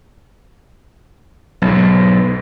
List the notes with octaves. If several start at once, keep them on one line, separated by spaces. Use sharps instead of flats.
B1 G#2